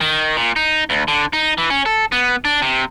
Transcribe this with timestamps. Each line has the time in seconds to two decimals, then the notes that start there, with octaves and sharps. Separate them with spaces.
0.01 D#3
0.36 A#2
0.56 D#4
0.90 D2
1.08 D3
1.33 D#4
1.58 E3
1.70 C#4
1.86 A4
2.12 B3
2.45 D4
2.62 C3